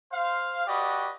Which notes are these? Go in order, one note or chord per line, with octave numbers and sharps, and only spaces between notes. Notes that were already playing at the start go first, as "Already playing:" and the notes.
C5 F5
F#4 G4 B4 D5 D#5